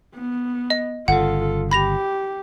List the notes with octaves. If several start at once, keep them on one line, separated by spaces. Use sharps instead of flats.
B3
D#5
G1 C#3 F4 A4 F#5
G4 B5 A#6 F7